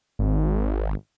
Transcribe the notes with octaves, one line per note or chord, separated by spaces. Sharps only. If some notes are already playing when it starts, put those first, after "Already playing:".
G#1